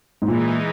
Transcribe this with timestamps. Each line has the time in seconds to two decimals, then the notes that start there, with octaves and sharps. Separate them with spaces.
0.22 G#2
0.28 A#2 E3 G#3 D#4